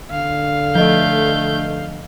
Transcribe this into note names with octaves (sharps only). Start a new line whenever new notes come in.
D3 F5
F3 A3 D#5 G6